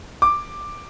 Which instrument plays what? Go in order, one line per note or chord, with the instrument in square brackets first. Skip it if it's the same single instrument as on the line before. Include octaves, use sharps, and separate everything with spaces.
[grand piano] D6